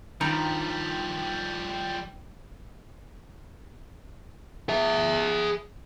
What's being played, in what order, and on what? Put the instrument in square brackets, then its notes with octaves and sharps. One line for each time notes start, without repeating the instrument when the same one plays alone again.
[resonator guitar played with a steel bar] G2 D#3 A#5 [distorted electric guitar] F3 G3
[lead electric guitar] G#4 E5